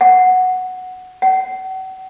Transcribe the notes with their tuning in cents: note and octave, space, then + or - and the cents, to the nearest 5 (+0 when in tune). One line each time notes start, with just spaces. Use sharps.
F#5 -5
F#5 +40